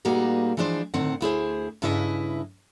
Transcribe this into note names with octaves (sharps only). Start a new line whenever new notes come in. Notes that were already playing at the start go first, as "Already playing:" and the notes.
A#2 G3 A#3 D#4 F#4 G#4
E3 F3 G#3 D4 C5
A2 D3 D#3 C4 F#5
D2 E4 G#4 C5
G2 C#3 E4 B4 D#5 E5